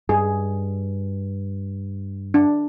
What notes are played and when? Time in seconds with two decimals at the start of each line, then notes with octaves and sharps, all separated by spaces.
0.09 G2 G#4
2.34 D4